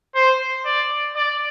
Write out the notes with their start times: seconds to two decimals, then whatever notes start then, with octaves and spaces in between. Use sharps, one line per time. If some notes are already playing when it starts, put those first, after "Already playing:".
0.15 C5
0.65 D5
1.16 D5